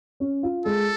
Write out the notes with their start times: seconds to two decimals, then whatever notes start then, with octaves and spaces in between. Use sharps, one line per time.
0.20 C#4
0.43 F4
0.66 G#3 A4